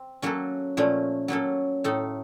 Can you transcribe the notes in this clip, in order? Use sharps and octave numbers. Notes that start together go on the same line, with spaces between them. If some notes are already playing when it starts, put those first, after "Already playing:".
Already playing: C4
F#3 A#3 C#4 F#4 A4
A#2 F3 A3 C#4
F#3 A#3 C#4 A4
A2 A3 D#4 A4